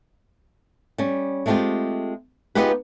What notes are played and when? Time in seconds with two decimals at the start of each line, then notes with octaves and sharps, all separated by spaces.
0.98 G3 C#4
1.46 G#3 A3 C4 C#4 F4 G4
2.55 B3 D#4 F4 G4 G#4 B4